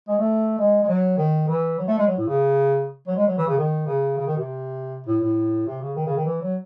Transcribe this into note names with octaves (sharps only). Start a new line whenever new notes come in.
G#3
A3
G#3
G#3
F#3
D#3
E3
F#3
A3
G#3
F#3
A2
C#3
F#3
G#3
F#3
E3
C#3
D#3
C#3
C#3
D#3
C3
A2
A2
C3
C#3
D#3
C#3
D#3
E3
F#3